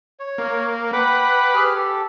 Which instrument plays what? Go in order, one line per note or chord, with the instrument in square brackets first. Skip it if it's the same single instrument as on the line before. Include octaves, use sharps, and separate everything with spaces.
[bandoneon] C#5
[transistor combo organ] A#3
[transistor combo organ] B4 [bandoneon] F#5 G5 D6
[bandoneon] G4 G#4 F6
G4 A4